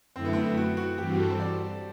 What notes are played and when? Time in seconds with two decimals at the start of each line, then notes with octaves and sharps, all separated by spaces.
0.16 F#2 D3 A3 C4 E4
0.25 B3
0.33 C4
0.57 F#4
0.77 F#4
0.98 G2 E3 G3 C4 F#4 G4
1.19 A4
1.30 C5
1.40 D5